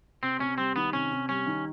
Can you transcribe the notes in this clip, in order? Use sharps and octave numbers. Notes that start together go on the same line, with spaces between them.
C3 C4
C3 C#4
G3 C4
D#3 B3
C3 C#4
C3
G3 C#4
D#3